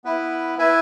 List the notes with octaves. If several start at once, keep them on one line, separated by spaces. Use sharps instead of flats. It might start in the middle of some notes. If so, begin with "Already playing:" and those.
B3 E4 B4
E4 B4 E5 G#5